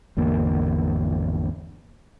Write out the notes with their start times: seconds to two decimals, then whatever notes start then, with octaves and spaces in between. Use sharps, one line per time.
0.17 G#1 E2 D3 A#3